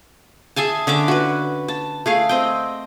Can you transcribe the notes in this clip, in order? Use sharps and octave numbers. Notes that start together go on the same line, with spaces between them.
G#4 E5 G#5 A5
D3 C#4 E5 D6
F#4 B4
A5
A3 G#4 F5
C4 D#5 G5